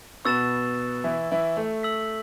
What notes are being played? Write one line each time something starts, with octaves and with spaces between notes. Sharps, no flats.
B2 B3 C#6 E6 A6 E7
E3 E4
E3 E4
A3
E6 B6 F#7